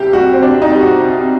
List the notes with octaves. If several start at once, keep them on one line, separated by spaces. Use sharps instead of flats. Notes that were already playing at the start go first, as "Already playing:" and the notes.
Already playing: C2 C3 G3 G4
G3 F#4
C4
C2 D4
D#4
G3
F#4
C2